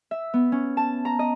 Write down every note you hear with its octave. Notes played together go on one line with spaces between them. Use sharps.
E5
B3
C#4
A5
A#5
D#5